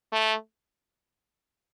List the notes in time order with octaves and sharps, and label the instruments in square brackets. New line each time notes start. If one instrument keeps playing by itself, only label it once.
[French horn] A3